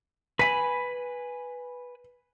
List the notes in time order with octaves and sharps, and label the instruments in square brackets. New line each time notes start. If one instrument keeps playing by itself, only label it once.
[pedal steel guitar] B4 G#5 B5 [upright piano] B6